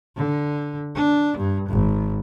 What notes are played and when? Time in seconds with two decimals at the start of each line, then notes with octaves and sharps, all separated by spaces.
0.16 D3
0.95 D4
1.37 G2
1.69 G#1